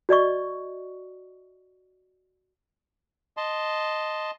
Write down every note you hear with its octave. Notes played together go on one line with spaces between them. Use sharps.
F#4 D5 D#5 C#6
D#5 A5 C6